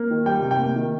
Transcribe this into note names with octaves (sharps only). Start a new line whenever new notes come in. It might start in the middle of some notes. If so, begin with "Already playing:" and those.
Already playing: A#3
D#3
G3 G5
C3
G5
A#3
D#3